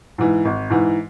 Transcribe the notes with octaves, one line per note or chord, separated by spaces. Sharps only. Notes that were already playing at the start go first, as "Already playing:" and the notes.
G#2 E3
G#1
G#2 E3